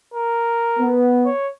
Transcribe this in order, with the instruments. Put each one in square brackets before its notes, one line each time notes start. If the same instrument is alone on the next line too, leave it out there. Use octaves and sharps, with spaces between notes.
[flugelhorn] A#4
[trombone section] B3
[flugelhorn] C#5